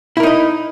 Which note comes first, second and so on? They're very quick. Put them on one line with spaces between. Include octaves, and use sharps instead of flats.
E4 A#4 D#4 D#5